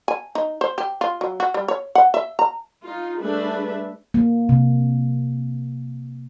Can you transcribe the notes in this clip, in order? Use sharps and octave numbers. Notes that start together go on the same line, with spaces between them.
G#5
D#4
C5
G4
F4
F#3
F#4
G3
C#5
F#5
E5
A#5
D#4 F4
G3 A3 D4 G#4 B4 E5
A#3
C3